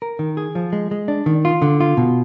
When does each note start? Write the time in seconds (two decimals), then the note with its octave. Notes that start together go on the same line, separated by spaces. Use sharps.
0.02 A#4
0.19 D#3
0.37 G#4
0.55 F3
0.73 G#3
0.91 G#3
1.08 D4
1.26 D#3
1.45 F4
1.62 D3
1.80 F4
1.97 B2